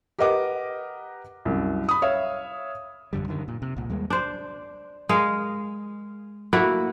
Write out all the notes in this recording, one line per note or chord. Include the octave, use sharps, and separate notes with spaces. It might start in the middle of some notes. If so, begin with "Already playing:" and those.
G4 A#4 B4 D#5 F#5 D6
C2 F#2
B5 D#6
C#5 E5 F5
A1 F#2 D3 G3
F#2 D3 D#3
A#2
C3
C2 A#2
D#2 G3 G#3 A#3
D4 C5
G#3 A#4 D#5 F5
A3 A#3 E4 F#4